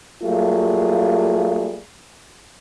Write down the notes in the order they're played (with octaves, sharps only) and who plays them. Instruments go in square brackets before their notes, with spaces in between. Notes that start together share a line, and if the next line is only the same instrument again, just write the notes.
[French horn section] F#3 G3 A3 A#3 F4 G#4